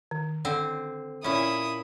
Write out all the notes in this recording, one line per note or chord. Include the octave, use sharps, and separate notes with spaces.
D#3
D3 C4
A#2 C#4 E4 B5 D#6